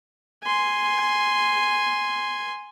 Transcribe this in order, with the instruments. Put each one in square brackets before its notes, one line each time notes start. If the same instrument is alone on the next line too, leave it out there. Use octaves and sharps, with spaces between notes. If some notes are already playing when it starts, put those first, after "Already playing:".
[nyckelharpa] G#5 C6